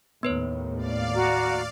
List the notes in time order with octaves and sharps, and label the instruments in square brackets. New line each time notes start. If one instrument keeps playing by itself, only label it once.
[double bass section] D#2 A2 [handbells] B3 B4 C#5
[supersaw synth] D5 F5
[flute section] F#4 A#5